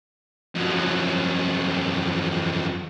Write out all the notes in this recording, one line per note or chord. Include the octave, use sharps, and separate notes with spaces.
F2 F#3